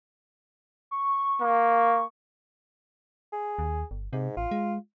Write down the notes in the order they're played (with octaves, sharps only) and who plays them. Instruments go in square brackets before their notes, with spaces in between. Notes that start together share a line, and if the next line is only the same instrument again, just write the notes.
[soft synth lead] C#6
[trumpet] A#3
[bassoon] G#4
[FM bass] D#2
G1
[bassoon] G#2 [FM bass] C3
[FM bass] A1 [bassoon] F4
[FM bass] G#3